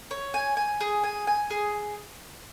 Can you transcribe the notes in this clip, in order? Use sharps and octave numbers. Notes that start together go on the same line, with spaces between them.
C#5
G#5
G#5
G#4
G#5
G#5
G#4